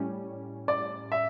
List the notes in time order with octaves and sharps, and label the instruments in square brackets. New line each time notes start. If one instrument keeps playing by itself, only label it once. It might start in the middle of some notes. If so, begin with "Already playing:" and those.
Already playing: [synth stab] A2 G3 C#4
[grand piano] D5
E5